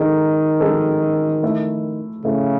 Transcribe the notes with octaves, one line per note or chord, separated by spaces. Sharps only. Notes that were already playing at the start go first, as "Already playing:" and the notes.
Already playing: D#3 G#3 D#4 A4
G#3 D#4 A4
A3 E4 A4
C#3 A3 E4 A4